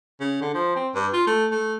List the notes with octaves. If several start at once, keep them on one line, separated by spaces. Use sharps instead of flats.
C#3
D3
F3
C4
G2
F4
A3
A3